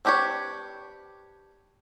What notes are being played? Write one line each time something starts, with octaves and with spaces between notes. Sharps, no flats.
C4 D4 G4 B4 C#5